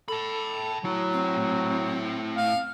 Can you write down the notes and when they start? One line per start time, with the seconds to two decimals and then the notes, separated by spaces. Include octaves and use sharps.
0.08 A4 A5 B5
0.85 A2 F#3 E4
1.13 C4
2.37 F5